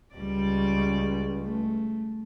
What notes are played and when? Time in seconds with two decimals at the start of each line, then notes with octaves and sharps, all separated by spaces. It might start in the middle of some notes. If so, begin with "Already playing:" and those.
0.15 C#2 G3 D5
1.40 A3